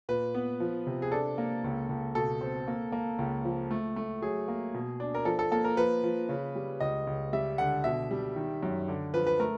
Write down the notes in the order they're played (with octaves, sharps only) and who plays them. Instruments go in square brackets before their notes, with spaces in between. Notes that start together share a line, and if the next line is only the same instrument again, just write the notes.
[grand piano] A#2 B4
B3
F3
C3
G#4
D4 A4
A#3
C#2
C#2
B2 A4
C4
A#3
A#3
C#2
F3
A3
A3
F#3 G#4
A#3
B2
D4
A#4
F3 A4
A4
A#3 A4
A#4
F3 B4
F3
C#3
G3
C#2 D#5
C#2
G3 E5
D3 F#5
B2 E5
G3
D#3
F#2
D3
F3 B4
B4
A3 A#4